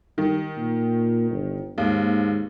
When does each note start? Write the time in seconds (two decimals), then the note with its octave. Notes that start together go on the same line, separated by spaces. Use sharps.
0.18 D#3 G3
0.58 A#2
1.31 G1
1.78 D#2 G#2